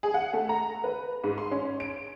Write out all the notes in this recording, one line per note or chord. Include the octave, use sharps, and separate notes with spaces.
G#4
F#5
A3
A#5
B4
G#2
C6
C#4
D7